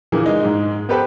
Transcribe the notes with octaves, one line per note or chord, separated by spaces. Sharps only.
A#2 D3 E3 A#3 G#4
G#3 D#4
G#2 G#3
B3 G4 A4 B4 C5